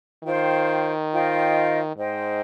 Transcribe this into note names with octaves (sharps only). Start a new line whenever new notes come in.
D#3 F4 C5 G5
F4 C5 D#5 G5
G#2 C5 D#5 G5